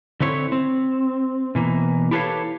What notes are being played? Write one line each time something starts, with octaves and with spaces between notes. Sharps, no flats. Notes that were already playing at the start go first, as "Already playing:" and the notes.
D3 C4 E4 C#5
C4
B2 E3 A#3
E4 G4 A4 B4 C#5 F5